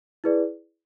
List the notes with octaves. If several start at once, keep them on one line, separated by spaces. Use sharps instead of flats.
E4 G#4 B4 D5